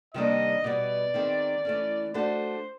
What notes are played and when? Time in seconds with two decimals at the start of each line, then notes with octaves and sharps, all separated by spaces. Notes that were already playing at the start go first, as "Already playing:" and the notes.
0.13 C3 D#3 G3 A#3 D4 D#5
0.64 B2 G3 B3 D5
1.14 D#3 G#3 C4
1.65 E3 A3 C#4
2.14 A3 D4 F#4 A4 C5